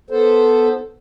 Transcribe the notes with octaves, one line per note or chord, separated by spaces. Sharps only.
B3 A4 C5